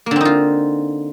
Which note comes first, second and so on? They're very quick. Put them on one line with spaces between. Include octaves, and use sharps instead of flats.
A#3 D3 C4 D#4 F4